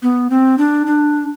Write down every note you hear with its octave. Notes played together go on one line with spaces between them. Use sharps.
B3
C4
D4
D4